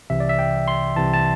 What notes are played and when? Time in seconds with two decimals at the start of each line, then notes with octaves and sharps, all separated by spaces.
0.10 C2 C3 E3 E5
0.20 D5
0.29 E5
0.39 G5
0.68 C6
0.96 C2 C3 E3 A5
1.14 A5